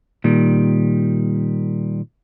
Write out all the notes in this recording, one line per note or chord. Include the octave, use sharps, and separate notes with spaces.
A#2 D#3 G3